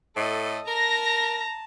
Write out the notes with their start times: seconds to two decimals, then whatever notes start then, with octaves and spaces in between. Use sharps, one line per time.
0.16 A2 A4 D#5
0.68 A#4 A5 A#5 A#6